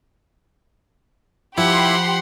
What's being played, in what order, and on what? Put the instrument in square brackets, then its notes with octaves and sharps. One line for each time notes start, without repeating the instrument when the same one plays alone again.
[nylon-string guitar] F3 [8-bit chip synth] E4 [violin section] G4 B5 C6 [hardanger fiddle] F#5